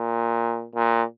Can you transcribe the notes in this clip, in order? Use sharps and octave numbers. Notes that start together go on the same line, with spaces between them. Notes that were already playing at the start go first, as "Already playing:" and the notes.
Already playing: A#2
A#2